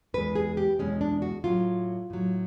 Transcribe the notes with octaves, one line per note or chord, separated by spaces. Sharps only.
E2 B2 G#3 B4
G#4
G4
E2 B2 G#3 C#4
D4
F#4
A2 F#3 F4
A2 F#3